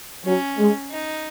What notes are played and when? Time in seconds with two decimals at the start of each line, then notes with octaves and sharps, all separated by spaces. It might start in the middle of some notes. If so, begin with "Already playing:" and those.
0.25 F#3 C#4
0.58 G#3
0.91 D#4